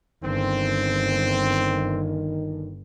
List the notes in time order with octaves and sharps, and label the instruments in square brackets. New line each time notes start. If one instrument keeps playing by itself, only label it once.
[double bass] G1 [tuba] D#3 [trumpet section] C4